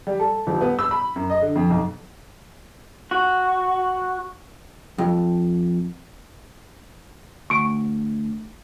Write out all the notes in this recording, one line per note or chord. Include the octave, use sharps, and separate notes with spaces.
G3
A4
D#1
B3
E6
B5
F#2
D#5
D3
F2
B1
F#4
F2
D2 C#6 D7